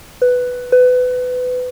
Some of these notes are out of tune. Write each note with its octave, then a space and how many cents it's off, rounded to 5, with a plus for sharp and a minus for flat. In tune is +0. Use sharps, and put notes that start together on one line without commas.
B4 +5
B4 +25